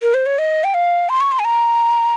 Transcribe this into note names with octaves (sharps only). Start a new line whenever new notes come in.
A#4
C5
C#5
D#5
G5
F5
C6
C#6
C6
G#5
A#5